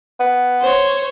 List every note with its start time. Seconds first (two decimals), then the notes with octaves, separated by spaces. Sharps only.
0.20 B3
0.61 C5 C#5